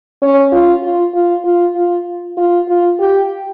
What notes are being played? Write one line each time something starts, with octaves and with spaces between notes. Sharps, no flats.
C#4
F4
F4
F4
F4
F4
F4
F4
G4